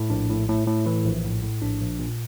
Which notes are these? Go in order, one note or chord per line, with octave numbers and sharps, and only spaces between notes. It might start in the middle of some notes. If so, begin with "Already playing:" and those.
Already playing: A2
A#1 D4
A2
A2
A2
E3 E4
A#1
A2
A2
A#1 D4
A#1
A#2